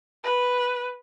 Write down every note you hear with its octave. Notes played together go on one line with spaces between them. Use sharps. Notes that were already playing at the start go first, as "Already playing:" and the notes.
B4